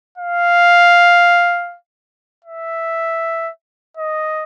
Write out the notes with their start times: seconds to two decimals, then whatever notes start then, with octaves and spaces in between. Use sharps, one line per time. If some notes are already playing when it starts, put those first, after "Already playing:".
0.18 F5
2.45 E5
3.97 D#5